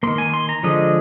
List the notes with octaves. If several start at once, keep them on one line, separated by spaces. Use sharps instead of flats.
D#3 A#3 C6
G#5
C6
A#5
D3 F3 G#3 D#5